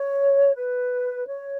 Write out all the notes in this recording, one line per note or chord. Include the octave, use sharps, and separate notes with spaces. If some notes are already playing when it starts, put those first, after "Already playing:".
Already playing: C#5
B4
C#5